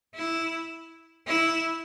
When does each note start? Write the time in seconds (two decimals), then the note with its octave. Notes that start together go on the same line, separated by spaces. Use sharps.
0.15 E4
1.27 E4